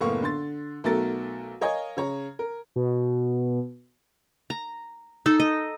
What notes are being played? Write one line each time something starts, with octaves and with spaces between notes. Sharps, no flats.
F#1 A2 A#3 B3 F5 C#6
D3 C6 A6
B1 A3 F#4 A4 A#4 A6
A#4 C#5 D#5 F5 G#5 G#6
C#3 C#5 A#5
A#4
B2
A#5
D#4 A4
D#5